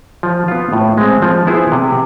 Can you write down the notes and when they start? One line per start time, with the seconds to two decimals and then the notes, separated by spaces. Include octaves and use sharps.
0.23 F3
0.48 B3 F4
0.73 A2
0.98 G#3 C4
1.22 F3
1.47 B3 E4 G#4 C5
1.72 C3